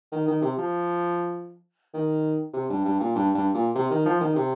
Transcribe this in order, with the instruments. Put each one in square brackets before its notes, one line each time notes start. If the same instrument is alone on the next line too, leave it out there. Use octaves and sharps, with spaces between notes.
[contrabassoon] D#3
D#3
C3
F3
D#3
C3
G2
G2
A#2
G2
G2
A#2
C3
D#3
F3
D#3
C3